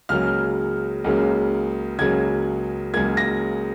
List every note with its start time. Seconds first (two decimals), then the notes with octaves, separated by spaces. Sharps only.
0.09 C#2 C#3 F#3 A#3 F6
1.04 C#2 C#3 F#3 A#3
1.99 C#2 C#3 F#3 A#3 G#6
2.93 C#2 C#3 F#3 A#3 G#6
3.17 A#6